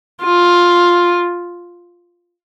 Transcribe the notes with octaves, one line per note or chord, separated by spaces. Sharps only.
F4